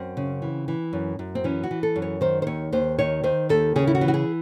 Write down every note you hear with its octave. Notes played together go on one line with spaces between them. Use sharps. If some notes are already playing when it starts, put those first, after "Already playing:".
Already playing: F#2 C4
C#3
E3
E3
F#2
F#2
C4
E3 C#4
F#4
E3
A4
F#2
C#5
D#3 C5
C5
D#2 C#5
D#2 C5
D#3 C#5
D#3 C5
D#2 A4
C#3 G#4
E4
F#4
E3
F#4
G#4